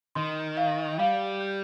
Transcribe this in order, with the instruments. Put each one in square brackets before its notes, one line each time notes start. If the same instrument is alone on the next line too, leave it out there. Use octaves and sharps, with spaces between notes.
[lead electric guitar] D#3 [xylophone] C6
[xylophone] F5
[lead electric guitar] G3 [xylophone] F5
[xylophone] G6